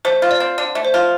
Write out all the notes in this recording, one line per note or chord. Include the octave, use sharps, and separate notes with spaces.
A3 C5
F4
D5
C4
D3 D5
A3
C5
F4